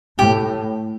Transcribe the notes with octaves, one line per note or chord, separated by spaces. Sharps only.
A2 G4